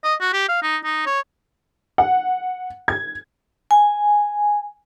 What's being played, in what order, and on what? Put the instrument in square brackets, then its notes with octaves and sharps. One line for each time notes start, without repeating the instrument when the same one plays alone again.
[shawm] D#5
F#4
G4
F5
D#4
D#4
C#5
[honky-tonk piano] F#5
G#6
[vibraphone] G#5